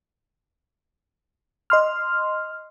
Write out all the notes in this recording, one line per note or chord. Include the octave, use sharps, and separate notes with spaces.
D#5 C6 F6